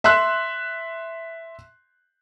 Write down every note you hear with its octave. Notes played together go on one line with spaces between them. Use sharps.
E5 C6 E6 F#6